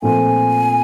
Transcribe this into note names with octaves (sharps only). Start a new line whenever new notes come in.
A#2 F3 A3 C4 F4 G#5